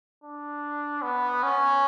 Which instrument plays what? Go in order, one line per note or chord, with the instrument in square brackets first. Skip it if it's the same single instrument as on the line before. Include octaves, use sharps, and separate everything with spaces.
[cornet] D4
B3
C#4